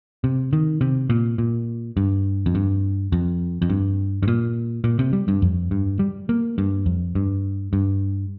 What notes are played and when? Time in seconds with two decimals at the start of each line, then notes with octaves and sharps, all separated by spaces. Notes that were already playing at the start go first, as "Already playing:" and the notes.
0.24 C3
0.53 D#3
0.81 C3
1.10 A#2
1.38 A#2
1.97 G2
2.46 F2
2.55 G2
3.12 F2
3.62 F2
3.70 G2
4.23 G2
4.28 A#2
4.84 A#2
4.99 C3
5.13 G3
5.28 G2
5.42 F2
5.71 G2
5.99 G3
6.29 A#3
6.58 G2
6.86 F2
7.15 G2
7.73 G2